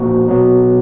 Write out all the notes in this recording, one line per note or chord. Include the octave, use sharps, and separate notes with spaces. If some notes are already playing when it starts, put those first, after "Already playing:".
Already playing: A#2 F3 A#3 F#4
B2 F#3 B3